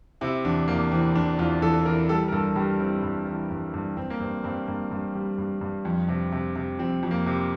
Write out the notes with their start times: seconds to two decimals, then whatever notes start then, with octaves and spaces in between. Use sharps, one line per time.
0.21 C3 E4
0.44 E2 D4
0.68 E2 A#3
0.91 E3 C4
1.16 E2 D4
1.39 E2 F4
1.62 E3 A4
1.86 E3 A#4
2.09 G3 A4
2.28 A#4
2.32 G2 A4
2.56 G2 G4
2.80 E3 C4
3.03 G2
3.27 E3
3.51 G2
3.74 G2
3.97 G2 C4
4.10 A#3
4.20 G2 C4
4.44 G2 C4
4.68 G2 A#3
4.91 G2
5.15 G3
5.38 G2
5.61 G2
5.85 F2
6.08 C3
6.32 C3
6.56 C3
6.79 F2 C4
7.03 F2
7.11 A#3
7.26 C3